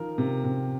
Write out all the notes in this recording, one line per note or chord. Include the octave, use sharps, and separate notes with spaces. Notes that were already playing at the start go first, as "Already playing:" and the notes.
Already playing: D#3 F3 A#4
C3
C3